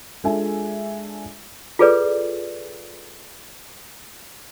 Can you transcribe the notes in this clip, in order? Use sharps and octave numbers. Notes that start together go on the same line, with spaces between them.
G#3 D4 F4 A4 E5 G#5
F4 G#4 A4 B4 D5